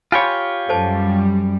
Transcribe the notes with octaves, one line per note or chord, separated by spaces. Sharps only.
F4 G4 C#5 G#5 B5 C6
F#2 G3 A4 C5 A5